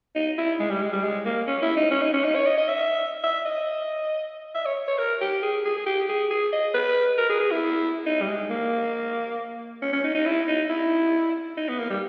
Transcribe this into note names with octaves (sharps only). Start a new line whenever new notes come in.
D#4
E4
G#3
G3
G#3
G3
G#3
A#3
C#4
E4
D#4
C#4
D#4
C#4
D#4
C#5
D#5
D#5
E5
E5
D#5
E5
C#5
C#5
A#4
G4
G#4
G#4
G#4
G4
G#4
G#4
D#5
B4
A#4
G#4
G#4
E4
D#4
G3
G#3
A#3
C#4
C#4
D#4
D#4
E4
D#4
E4
D#4
B3
A#3
G3